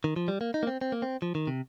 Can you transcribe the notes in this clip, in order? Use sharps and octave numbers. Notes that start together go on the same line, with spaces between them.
D#3
F3
G3
A#3
D#4
A#3
C4
C4
A#3
C4
F3
D#3
C3